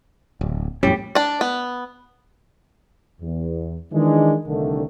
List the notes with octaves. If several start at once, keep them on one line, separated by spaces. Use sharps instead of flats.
D1
F2 A2 G3 C#4
D4 D5
B3
E2
D#3 E3 G#3 D4
C2 D3 D#3 A3